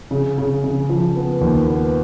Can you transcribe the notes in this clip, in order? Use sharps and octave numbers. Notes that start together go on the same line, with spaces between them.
C#3
C#3
C#3
F3
B3
D#2
B3